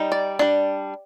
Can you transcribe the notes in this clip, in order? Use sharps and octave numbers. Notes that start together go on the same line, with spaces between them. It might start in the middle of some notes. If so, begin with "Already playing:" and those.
Already playing: G3 D#4
D5
G3 D4